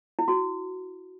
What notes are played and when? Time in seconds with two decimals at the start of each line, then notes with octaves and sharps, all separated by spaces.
0.19 E4
0.28 F#4